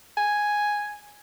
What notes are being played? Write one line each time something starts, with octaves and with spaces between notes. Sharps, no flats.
G#5